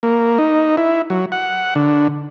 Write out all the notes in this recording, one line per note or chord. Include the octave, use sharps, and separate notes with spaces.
A#3
D#4
E4
F#3
F#5
D3